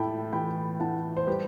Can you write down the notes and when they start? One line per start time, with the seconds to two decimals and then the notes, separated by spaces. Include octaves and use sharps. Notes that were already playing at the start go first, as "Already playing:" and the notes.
Already playing: A2 A3 G5 A5 B5
0.33 E3 G5 B5
0.80 A2 F#5 A5
1.17 C5
1.27 G3 G4 B4